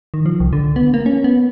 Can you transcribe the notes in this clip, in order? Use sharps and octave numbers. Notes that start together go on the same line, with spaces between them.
D#3
F3
C2
D3
B3
A#3
C#4
B3